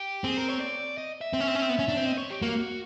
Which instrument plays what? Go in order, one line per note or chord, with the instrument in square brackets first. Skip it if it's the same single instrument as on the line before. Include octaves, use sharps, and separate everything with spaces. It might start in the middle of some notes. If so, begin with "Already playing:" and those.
Already playing: [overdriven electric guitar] G4
[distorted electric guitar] C4 [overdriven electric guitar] G#4
[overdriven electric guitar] A#4
C#5
D5
D#5
E5
[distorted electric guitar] C4
C#4
C4
C#4
C4
B3
C#4
D4
C4
[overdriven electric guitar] D#5
C#5
G4
[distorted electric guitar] A#3 [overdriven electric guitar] F#4